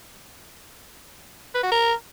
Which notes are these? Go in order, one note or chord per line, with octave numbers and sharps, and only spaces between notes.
B4
F#4
A#4